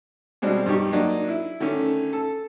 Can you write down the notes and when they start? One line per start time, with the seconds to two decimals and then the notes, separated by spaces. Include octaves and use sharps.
0.42 B2 G3 G#3 C4 D4
0.66 G2 D#4 G4 C#6
0.92 F#3 A#3 D4 D#4
1.29 E4
1.60 D3 D#3 A3 C#4
2.13 A4